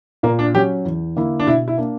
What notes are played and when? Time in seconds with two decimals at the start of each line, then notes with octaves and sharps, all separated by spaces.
0.23 A#2 A#3
0.39 D4
0.54 F#3 C#4 G4
0.85 E2
1.16 D3 A#3 E4
1.40 D4
1.47 B2 E4
1.68 E4
1.78 A#3 D4